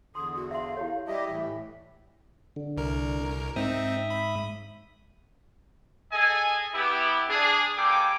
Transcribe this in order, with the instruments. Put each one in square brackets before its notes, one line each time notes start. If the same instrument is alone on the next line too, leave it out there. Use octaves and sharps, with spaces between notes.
[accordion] E2 D3 [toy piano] C6 [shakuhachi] D#6
[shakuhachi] F#4
[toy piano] E5 C6 [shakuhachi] F5
[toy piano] E4 G4 C#5
[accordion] G3 G4 D#5 [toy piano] E4 [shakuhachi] E5
[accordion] A2 E3
[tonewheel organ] D3
[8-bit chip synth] C2 A#4
[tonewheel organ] G#2 E5 D#6 [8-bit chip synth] C4 D#4
[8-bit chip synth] B5
[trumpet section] G#4 A4 D#5 G#5
B3 E4 G4
D4 G#4
G3 A#3 A4 G5 G#5 D6